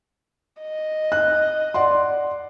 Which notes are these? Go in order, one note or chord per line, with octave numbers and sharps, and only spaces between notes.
D#5
F#6
D5 F#5 C6